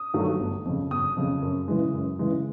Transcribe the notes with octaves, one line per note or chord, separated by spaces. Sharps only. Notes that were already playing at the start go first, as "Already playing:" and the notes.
Already playing: D#6
G2 D#3 F#3 A3
G1
F2 C#3
G1 D#6
F2 C#3
F#2
C#3 E3 G#3
F#2
C#3 E3 G#3